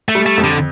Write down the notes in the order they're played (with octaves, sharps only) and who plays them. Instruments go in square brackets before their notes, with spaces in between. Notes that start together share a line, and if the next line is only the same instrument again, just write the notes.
[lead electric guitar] A3
[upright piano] G3
[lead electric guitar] A3
[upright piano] F2
[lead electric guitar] D3